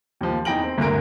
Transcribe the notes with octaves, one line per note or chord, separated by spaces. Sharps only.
D#2 F3
E2 D#4 G5 A#6 D7 F#7
C4
G1 D2 D3 A#4 D7